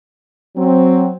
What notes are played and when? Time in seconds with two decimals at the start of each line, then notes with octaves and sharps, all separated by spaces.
0.56 F#3 C4